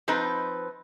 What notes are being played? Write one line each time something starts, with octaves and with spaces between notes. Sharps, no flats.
F3 C4 D#4 B4